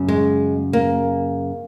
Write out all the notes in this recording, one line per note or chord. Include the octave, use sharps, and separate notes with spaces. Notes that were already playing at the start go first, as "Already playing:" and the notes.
Already playing: F#2 C#3
G#3
A#3